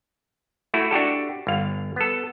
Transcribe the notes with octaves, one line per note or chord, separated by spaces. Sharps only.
A3 E4 F#4
D4 F#4 G4 A4
G1 F5
B3 A4